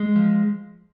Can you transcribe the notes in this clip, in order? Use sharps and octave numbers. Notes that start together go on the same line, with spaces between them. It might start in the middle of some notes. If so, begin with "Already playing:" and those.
Already playing: G#3
F3